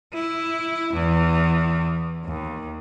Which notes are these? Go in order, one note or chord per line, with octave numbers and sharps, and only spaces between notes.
E4
E2
D#2